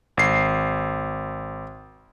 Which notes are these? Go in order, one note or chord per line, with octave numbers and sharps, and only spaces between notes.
G#1 C7